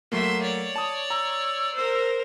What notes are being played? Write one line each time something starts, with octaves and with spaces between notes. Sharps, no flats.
F#3 A3 A#3 E5 C6
C#5 D5
A5 D#6
A#5 E6
A#4 C5